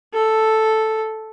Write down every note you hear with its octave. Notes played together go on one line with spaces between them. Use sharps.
A4